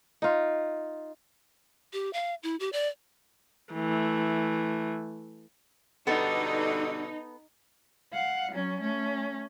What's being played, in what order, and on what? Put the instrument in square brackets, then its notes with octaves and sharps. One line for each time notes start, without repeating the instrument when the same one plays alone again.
[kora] D#4 F4
[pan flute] G4
F5
E4
G4
D5
[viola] E3 A3
[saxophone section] G2 B2 D3 [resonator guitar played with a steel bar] B3 A4 [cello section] D#4
[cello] F5 F#5
F#3 C#4
A3 C#4